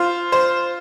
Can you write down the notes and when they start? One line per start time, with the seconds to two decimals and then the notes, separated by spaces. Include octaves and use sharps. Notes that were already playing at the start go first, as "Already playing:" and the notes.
Already playing: F4 C5
0.32 C5